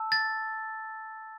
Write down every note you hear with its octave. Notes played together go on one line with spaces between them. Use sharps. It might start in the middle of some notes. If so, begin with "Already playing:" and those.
Already playing: A5 E6
A6